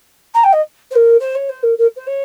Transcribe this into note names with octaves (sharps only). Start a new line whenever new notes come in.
A#5
G5
D#5
C5
A#4
C5
C#5
C5
A#4
A#4
C5
C#5